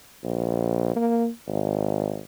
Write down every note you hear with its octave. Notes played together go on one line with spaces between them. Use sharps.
A#1
A#3
G#1